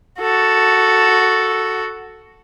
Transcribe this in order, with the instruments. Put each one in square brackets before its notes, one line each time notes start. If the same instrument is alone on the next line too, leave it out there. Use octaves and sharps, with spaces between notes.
[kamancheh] F#4 A4